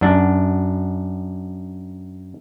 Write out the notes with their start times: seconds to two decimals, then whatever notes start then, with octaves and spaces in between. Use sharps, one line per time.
0.01 F#2 D4